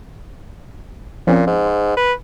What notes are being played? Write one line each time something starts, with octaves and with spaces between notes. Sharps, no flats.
A#2 F3 C4 C#4
G#2
C5
B4